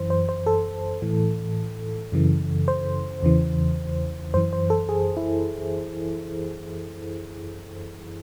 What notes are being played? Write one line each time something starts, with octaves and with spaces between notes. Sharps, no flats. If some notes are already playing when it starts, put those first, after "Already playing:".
Already playing: F#2 E3 C5
C5
C5
A4
A2 E3
F#2 C#3 E3
C5
E2 C#3 E3
F#2 E3 C5
C5
A4
G#4
E4